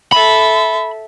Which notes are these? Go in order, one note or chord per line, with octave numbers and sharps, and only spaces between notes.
A4 E5 B5